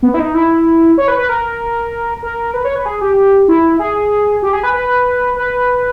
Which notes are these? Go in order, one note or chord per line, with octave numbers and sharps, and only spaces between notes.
B3
E4
D#4
E4
C#5
B4
B4
A#4
A#4
B4
C#5
B4
G#4
G4
E4
G#4
G4
G#4
B4
B4
B4